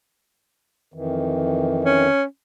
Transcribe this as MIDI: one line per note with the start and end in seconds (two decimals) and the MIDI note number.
0.94 2.08 41
0.94 2.08 51
0.94 2.08 52
1.84 2.23 61